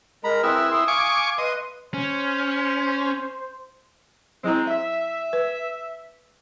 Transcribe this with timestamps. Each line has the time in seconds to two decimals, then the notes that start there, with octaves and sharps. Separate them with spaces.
0.24 G#3 A#4 A#5 B5
0.43 C4 E4 G#4 B4
0.72 C6 D#6
0.88 F5 G#5 C#6 D6
1.38 B4 D#5 C6
1.94 C#4 C5
4.44 F#3 G#3 C4 E4 A#5
4.68 E5
5.33 B4